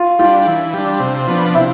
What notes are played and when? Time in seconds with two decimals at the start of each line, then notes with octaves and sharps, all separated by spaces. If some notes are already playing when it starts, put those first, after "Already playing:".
Already playing: F4
0.19 G3 D4 F4
0.47 E3
0.73 G3 D4
1.00 C3
1.27 F3 B3 D4
1.55 C3 E4